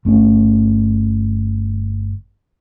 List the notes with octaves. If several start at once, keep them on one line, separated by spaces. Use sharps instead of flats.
G1 A3 C#4